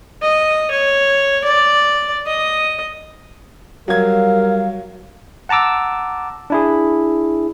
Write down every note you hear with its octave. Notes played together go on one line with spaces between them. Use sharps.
D#5
C#5
D5
D#5
F#3 G3 A#4 F5 G#6
F#5 A5 A#5 D6 E6
D4 E4 G#4